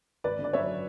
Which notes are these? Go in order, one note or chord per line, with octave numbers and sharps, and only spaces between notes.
G#1 B4 D5
D3
D5
F#2 C#5 E5